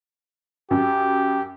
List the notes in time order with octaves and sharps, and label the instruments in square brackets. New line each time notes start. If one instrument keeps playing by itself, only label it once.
[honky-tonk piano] F#2 [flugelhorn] G4